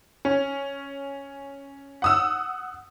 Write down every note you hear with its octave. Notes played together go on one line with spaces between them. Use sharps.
C#4
F#5 D#6 E6